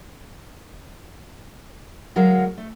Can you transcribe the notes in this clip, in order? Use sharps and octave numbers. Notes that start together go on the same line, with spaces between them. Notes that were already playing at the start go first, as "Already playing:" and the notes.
D2 F#3 G#3 A#4 F5
A3